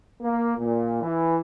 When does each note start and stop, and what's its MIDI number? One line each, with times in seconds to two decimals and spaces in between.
0.20 0.52 58
0.57 0.97 46
1.02 1.38 52